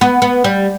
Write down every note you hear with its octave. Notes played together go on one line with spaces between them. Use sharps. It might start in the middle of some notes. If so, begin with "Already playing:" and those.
B3
B3
G3